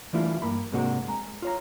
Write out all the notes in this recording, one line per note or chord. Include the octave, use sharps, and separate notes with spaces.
E3 G3 A3 D4 E4 F4
G2 A#3 B5
G#2 C3 G#3 A#3 D4 F#4
G#3 A#5
F4 C#5 A#5